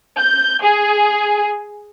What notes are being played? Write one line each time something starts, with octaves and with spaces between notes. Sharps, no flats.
G6
G#4